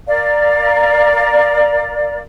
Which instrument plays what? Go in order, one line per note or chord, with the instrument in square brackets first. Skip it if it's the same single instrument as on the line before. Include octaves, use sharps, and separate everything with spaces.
[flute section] A#4 D5 F5